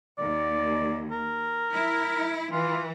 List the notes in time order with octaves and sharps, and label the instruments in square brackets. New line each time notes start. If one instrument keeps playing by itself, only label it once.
[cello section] D#2 [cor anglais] D5
[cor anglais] A#4
[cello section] E4
[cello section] E3 [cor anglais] F4